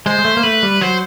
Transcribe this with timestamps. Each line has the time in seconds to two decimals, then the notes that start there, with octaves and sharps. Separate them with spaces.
0.06 G#3 C5
0.19 G#3
0.25 A3
0.37 A#3
0.43 A3 B4
0.63 G3
0.81 F#3 C5